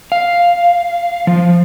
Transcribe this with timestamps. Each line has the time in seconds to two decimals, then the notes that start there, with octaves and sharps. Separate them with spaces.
0.12 F5
1.27 F3